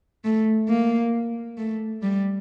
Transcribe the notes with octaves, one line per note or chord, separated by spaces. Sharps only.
A3
A#3
A3
G3